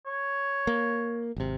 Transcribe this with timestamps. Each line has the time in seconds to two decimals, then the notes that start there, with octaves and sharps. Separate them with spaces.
0.06 C#5
0.67 A#3
1.36 G#1 C3